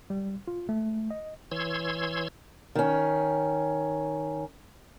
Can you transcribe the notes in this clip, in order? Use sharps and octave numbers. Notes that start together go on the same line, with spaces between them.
G3
F4
A3
D#5
E3 C#5 C6 E6 G#6
D#3 C#4